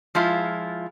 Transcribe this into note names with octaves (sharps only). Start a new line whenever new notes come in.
F3 G#3 E4 F4